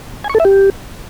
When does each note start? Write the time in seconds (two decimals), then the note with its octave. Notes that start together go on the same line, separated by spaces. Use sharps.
0.24 G#5
0.30 C#6
0.35 A4
0.40 E5
0.45 G4